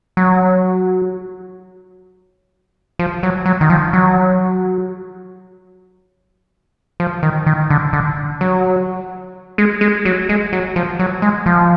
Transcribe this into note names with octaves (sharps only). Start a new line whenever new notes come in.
F#3
F3
F#3
F#3
D#3
F3
F#3
F3
D#3
D#3
D3
D3
F#3
G#3
G#3
F#3
G#3
F#3
F3
F#3
G#3
F3